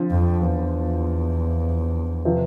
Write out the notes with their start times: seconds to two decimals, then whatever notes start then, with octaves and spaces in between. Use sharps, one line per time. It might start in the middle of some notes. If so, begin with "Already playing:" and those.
Already playing: D3 F3 C4
0.11 F2
0.42 E2
2.25 C3 F3 B3